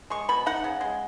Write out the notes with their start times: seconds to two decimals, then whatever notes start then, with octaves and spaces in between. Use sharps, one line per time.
0.10 G#3 C#6
0.29 B2 B5
0.46 D#4 F#5
0.64 C#3
0.81 G#3